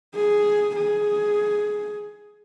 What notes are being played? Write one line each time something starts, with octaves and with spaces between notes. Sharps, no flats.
G#4
G#4